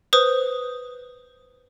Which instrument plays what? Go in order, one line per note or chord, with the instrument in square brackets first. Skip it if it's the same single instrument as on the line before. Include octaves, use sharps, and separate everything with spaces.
[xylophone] B4 C5 D#6